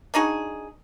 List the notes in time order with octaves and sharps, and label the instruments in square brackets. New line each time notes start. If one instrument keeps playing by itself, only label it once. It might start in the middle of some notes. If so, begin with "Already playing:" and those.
[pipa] D4 D#4 F#4 G#4